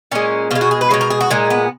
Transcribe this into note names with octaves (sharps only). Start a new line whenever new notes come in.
A#2 G#3 C#4
B2 G#3 F4
F#4
G#4
B4
B2 G#3 C#5
A#4
G#4
F#4
A#2 G#3 D#4
B3